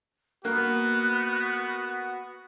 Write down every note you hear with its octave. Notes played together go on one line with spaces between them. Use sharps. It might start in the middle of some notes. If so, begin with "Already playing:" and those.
A#3 B3 F#4 F#6